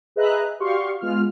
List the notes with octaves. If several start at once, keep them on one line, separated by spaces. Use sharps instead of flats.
G#4 B4 D#5 E5 A#5 F#6
F#4 G4 D5 F5 C6 C#6
G#3 B3 F4 F6